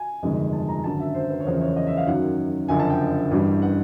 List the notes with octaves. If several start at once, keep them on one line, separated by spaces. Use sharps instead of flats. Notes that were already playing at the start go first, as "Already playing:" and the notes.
Already playing: G#5
G1 F2 C3 D#3 G#3
A5
A#5
G#1 F#2 D3 F#3 A5
E5
C5
B4
C#5
F#1 E2 C#3 F3 C5
C#5
D#5
E5
F5
F#2 D#3 F#3 F#5
F#1 F2 D3 F3 G#5
A5
G5
A1 G2 E3 G3
F#5